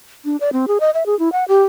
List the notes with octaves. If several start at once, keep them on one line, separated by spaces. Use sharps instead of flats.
D4
D5
C4
G#4
D#5
E5
G#4
E4
F#5
G4